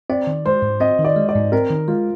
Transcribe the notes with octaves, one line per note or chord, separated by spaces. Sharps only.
C4 D5
D#3
G#3 C5
G#2
C4 D#5
D#3
D5
G#3
D5
G#2
C4 A#4
D#3
G#3 F4